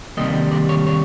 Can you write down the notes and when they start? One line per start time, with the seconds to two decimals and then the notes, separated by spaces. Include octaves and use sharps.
0.17 C3 D#3 G3 A#3 D#5
0.51 D5
0.69 C#5
0.87 C#5